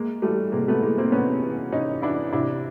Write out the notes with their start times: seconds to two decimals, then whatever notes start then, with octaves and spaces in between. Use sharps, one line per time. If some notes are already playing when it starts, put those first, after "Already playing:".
Already playing: G#3 A#3
0.22 E3 G3 A3
0.52 C3 G#3 A#3
0.68 A3 B3
0.82 E3 G#3 A#3
0.98 A#3 C4
1.12 C3 B3 C#4
1.42 E3
1.72 C3 C#4 D#4
2.02 E3 D4 E4
2.33 C3 D4 E4